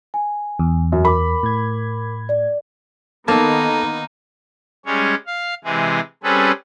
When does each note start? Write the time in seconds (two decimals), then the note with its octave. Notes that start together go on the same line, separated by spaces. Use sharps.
0.14 G#5
0.59 E2
0.92 F#2
1.05 A#4 B5 D6
1.43 A2 G#6
2.29 D5
3.28 D#3 A#3 B3 D#4 A4 A5
4.86 G3 G#3 C#4 C#5
5.27 F5
5.64 C3 E3 G#3 G#4
6.23 G3 C4 C#4 G#4 A4 B4